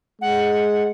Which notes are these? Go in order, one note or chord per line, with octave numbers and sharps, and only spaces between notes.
G#3 F#5